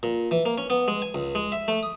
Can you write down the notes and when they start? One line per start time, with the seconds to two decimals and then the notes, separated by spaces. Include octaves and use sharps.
0.03 A#2
0.31 E3
0.45 A#3
0.58 C#4
0.70 B3
0.88 G#3
1.02 G#5
1.14 C#2
1.35 G#3
1.52 E5
1.68 A3
1.83 D#6